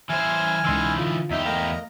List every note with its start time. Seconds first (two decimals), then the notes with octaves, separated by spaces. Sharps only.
0.09 E3 C5 G#5 F6
0.65 C#2 E3 D#4 C6 E6
0.99 D3 F4
1.31 E2 D#4 G4 E5
1.46 A3 A#4 D#5 F5 A#5